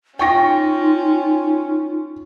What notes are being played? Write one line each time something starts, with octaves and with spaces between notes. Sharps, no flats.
C#4 D#4 F4 G5 C#6 A#6